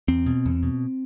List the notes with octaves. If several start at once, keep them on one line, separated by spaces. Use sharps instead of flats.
E2 C4
B2
E2
B2